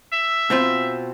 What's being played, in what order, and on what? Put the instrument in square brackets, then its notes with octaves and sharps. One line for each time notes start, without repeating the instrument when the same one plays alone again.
[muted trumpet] E5
[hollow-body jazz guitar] B2 C4 F4